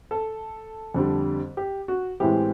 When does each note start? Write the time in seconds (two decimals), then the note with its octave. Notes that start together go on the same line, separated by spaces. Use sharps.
0.11 A4
0.94 F2 D3 G3
1.57 G4
1.88 F#4
2.20 A2 E3 G#3 C4 G4